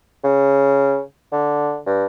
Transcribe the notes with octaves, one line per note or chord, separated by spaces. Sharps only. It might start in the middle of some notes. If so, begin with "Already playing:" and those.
C#3
D3
G2